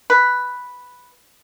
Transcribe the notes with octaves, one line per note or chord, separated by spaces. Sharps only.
B4